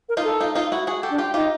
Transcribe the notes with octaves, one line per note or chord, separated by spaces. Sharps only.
A#4
D#4 F4
A4
D#4 F4
D#4 F4
E4 F#4
F#4 G#4
G4 A4
D4
F4 G4
D#4 F4 G4